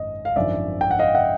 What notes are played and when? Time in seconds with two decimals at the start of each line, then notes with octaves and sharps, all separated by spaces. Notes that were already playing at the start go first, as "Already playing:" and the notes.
Already playing: G#1 F#2 D#5
0.25 F5
0.36 G#1 F#2 D3 F3 D5 E5
0.81 G5
0.91 F#5
0.99 D#5 F5
1.15 E5 F#5